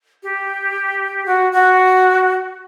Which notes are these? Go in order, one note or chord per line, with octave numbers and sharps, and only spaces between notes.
G4
F#4
F#4